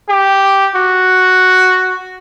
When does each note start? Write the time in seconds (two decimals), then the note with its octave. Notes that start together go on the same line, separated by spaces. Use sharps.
0.09 G4
0.76 F#4